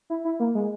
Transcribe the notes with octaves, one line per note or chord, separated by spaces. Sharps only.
E4
E4
A#3
G#3